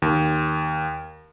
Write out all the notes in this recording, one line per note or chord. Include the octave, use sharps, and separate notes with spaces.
D#2